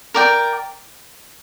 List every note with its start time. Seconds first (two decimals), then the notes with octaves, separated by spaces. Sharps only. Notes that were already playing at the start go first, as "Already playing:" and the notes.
0.14 A#4 D5 G5